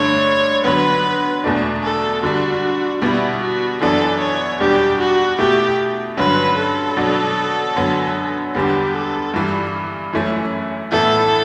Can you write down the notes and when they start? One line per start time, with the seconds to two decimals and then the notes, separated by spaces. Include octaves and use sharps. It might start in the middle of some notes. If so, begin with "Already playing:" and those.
Already playing: G2 D3 A3 D4 C#5
0.64 D3 F#3 B3 B4
1.44 E2 B2 A3 D4
1.83 A4
2.23 D3 G3 D4 F#4
3.01 B2 G3 B3 E4
3.42 F#4
3.81 F#2 E3 B3 D4 A4
4.20 C#5
4.60 E2 B2 G3 D4 G4
4.99 F#4
5.38 B2 A3 E4 G4
6.17 G2 D3 F#3 C#4 B4
6.57 A4
6.97 B2 F#3 B3 D4
7.76 F#2 D3 F#3 B3
8.55 E2 D3 G3 B3 G4
8.94 A4
9.34 G2 E3 G3
10.13 F#2 E3 A3 C#4 E4
10.92 A2 E3 B3 E4 A4